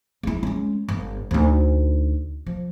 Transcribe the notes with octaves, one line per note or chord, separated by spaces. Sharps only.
G#3 E4
G#3 C#4
G1
D2 D#4
F3